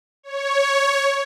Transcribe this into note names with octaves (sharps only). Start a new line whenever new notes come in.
C#5